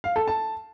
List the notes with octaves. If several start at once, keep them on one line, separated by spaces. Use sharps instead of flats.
F5
A4
A5